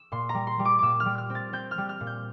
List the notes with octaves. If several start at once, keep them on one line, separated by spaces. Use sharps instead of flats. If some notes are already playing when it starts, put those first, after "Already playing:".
Already playing: E6
A#2 C6
A#5
G3
C6
G3
D6
A#2 D6 E6
F6
G3
F6
C4
A6
C4 G6
F6
G3
F6
A#2
G6